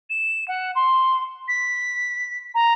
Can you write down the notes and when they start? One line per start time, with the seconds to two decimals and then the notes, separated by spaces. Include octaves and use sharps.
0.10 E7
0.48 F#5
0.75 C6
1.48 B6
2.54 A#5